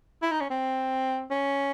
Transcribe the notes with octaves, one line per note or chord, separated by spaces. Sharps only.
E4
D#4
C#4
C4
C#4